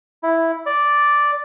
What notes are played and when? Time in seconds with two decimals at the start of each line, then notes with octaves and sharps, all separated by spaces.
0.23 E4
0.66 D5